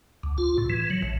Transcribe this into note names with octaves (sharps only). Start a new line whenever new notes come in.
D2
F4
A2
E3
F#3
A1